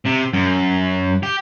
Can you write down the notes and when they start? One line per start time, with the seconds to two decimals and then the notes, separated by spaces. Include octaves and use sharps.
0.06 C3
0.33 F#2
1.23 G4